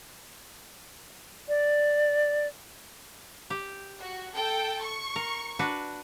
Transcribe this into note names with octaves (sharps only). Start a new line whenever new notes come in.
D5
G4
F#4
A4 G5
C#6
A#4
D4 F#4 B4